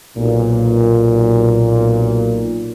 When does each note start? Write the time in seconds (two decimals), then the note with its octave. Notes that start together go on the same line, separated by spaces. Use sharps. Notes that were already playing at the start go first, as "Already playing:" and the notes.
0.18 B1 A#2